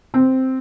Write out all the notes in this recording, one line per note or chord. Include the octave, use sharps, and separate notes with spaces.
C4